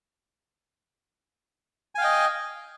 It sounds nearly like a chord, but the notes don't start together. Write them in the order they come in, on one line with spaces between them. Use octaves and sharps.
G#5 F5 G5 D#5